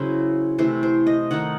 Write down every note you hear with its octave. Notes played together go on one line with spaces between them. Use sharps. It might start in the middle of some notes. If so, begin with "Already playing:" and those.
Already playing: C#3 F#3 C#4 E4 C5
C3 E3 A3 C5
C5
D#5
D#3 A3 D#4 F#5